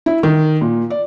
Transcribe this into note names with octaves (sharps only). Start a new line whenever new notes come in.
E4
D#3
A#2
D5